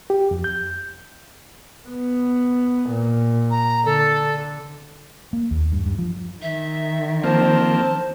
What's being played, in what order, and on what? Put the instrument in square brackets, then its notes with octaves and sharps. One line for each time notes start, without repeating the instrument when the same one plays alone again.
[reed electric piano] G4
F2
G6
[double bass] B3
A#2
[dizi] A#5
[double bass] D3 [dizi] A4
[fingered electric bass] A#3
D#2
G2
G2
F3
[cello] D#3 [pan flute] E5
[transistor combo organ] F3 A#3 C4 [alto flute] C5 [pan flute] A5